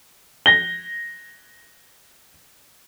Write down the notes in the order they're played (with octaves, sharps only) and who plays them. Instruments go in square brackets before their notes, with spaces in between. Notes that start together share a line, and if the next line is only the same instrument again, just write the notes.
[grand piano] A#6 G7